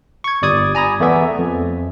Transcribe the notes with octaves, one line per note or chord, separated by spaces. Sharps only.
C#6 G#6
G1 G3 D5 D#6 G#6
G#5 A#5 B5 D#6
E2 A3 B3 D5 E5 G#5
F2